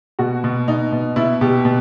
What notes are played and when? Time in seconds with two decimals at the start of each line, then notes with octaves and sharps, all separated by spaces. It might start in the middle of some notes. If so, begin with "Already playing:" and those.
0.19 B2 F#4
0.44 B2
0.68 B2 D#4
0.92 B2
1.16 B2 E4
1.41 B2 G4
1.65 B2